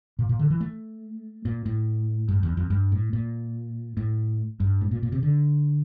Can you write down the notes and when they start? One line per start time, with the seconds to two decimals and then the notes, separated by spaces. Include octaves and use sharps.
0.19 A#2
0.29 A#2
0.39 D3
0.50 E3
0.61 A3
1.45 A#2
1.66 A2
2.28 G2
2.43 E2
2.57 F2
2.70 G2
2.92 A2
3.13 A#2
3.97 A2
4.60 G2
4.81 A2
4.91 A#2
5.03 A#2
5.12 C3
5.23 D3